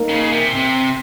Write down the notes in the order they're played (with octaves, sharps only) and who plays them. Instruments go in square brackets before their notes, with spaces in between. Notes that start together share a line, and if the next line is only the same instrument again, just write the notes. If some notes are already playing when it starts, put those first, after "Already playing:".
Already playing: [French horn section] A#3 D#4 A#4
[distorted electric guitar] C#3
C3
C3